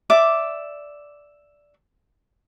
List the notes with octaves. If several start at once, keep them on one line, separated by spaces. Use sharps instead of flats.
D5 E5 D6